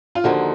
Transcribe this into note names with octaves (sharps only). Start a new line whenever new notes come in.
F4
D#2 D3 F3 A#3 D#4 F#4